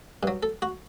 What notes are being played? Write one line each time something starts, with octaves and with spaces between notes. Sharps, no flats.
G2 F#3
A4
F#4